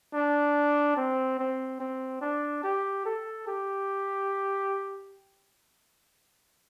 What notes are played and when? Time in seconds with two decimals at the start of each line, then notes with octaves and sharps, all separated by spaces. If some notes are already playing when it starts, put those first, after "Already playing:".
0.13 D4
0.97 C4
1.39 C4
1.80 C4
2.21 D4
2.63 G4
3.05 A4
3.47 G4